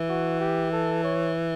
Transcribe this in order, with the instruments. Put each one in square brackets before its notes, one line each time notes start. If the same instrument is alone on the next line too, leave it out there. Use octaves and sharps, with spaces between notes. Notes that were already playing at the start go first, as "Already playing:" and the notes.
Already playing: [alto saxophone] E3
[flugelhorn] F#4
G4
A4
C#5